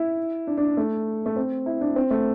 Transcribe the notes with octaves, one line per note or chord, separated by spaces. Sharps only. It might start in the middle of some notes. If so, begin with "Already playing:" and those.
Already playing: E4
D4
D4
A3
A3
C4
E4
D4
C4
A3